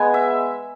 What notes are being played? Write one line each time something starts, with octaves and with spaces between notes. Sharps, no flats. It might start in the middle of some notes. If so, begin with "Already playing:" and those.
Already playing: G#3 B3 G#5
E5